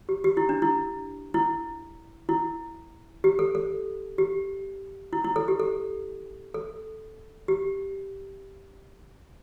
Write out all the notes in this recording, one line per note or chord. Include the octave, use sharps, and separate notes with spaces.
G4
G4
E4
D4
E4
E4
E4
G4
A4
A4
G4
E4
E4
A4
G4
A4
A4
G4